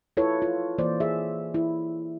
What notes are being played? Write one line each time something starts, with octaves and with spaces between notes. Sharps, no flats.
E4 F4 A4 B4 C#5
F4
E3 A#3 C5 D5
G#4 E5
E4